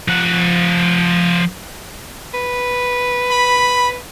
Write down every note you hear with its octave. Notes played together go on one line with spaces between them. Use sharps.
F3 F#5
B4
B5